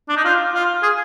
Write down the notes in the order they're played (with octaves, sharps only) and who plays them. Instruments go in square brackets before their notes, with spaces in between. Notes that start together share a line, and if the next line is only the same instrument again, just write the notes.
[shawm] D4
D#4
F4
F4
G#4